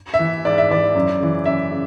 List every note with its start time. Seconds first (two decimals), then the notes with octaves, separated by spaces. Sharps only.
0.14 E5
0.19 E3
0.45 G#2 D5
0.58 E5
0.71 E3 D5
0.95 F#2
1.20 C#3 E3
1.46 F#2 E5
1.71 C#3